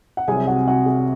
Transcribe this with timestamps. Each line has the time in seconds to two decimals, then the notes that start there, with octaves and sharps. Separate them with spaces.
0.17 F#5
0.28 C2 C3 F#3 C4 G#4 G#5
0.47 F#4 F#5
0.67 F#4 F#5
0.86 G#4